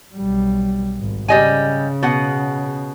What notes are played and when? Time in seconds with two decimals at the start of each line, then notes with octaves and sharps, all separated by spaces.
0.15 B1 G3
0.97 G#1
1.28 C#3 G3 D#5 G#5
2.03 B2 F#5